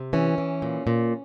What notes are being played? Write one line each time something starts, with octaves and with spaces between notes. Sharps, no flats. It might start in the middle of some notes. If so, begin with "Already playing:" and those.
Already playing: C3
E3 C#4
E3
A#2
A#2